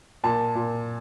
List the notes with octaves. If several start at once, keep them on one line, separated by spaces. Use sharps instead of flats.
A#2 A5
A#2